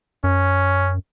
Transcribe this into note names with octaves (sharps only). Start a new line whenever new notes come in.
F#2 C#4